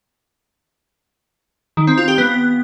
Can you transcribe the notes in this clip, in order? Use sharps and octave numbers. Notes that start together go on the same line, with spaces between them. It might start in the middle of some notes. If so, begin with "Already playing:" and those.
D#3
C4
F4
G4
B3